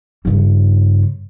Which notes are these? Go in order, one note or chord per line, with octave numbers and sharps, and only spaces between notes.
G2 C#3